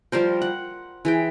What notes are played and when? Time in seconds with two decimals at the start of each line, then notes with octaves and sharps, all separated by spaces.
0.12 F3 G3 A#4 C5
0.42 F#5
1.05 E3 G#4 G5